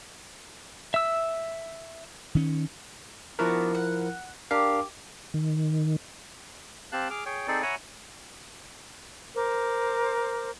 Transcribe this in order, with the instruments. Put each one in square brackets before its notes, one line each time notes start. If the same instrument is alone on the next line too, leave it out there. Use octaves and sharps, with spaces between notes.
[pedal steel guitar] E5 E6
[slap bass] D#3 C#4
[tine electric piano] F3 E4 A#4 [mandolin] B3 D4 F#4
[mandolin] F#5
[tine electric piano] D4 A#4 F5 [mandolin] G4
[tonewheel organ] D#3
[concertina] C4 G4 F5 A5 F#6
G#4 D6 F6
G#4 C#5 G5
C4 D#4 G#4 A4 C5 D5
C#5 E5 F#5 G#5 A#5 B5
[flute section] A#4 C5 D6